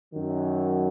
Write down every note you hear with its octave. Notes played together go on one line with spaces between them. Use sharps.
F#2 D#3 F#3